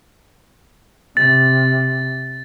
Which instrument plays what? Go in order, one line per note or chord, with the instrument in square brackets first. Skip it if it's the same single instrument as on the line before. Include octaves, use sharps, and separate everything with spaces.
[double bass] C3 [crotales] A6